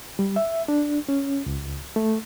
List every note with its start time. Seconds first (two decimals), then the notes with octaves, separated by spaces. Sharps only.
0.19 G3
0.36 E5
0.68 D4
1.09 C#4
1.46 C#2
1.96 A3